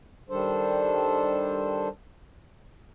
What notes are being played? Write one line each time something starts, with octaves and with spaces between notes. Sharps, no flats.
D#3 G3 D4 A4 C5